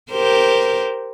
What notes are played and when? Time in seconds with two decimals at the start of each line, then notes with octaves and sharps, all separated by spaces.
0.11 G4 A#4 C5